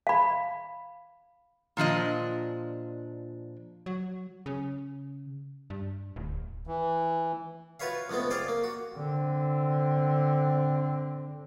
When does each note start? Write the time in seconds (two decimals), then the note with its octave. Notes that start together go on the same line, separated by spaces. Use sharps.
0.07 F5 B5
1.77 A#2 F3 D4 D#5
3.86 F#3
4.46 C#3
5.70 G2
6.16 D1
6.67 E3
7.80 F4 F#4 B4 C#5 E5 F5
8.09 C#2 G#3 A3 B3 C4
8.30 F4 G#4 C5 D5 F5 G5
8.48 A#3
8.64 F#4
8.96 D3 C4